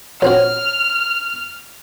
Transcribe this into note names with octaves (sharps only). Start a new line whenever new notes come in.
A#1 C4 F#4 C#5 F6